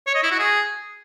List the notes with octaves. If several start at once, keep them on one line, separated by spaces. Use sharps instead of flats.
C#5
D#5
E4
F#4
G#4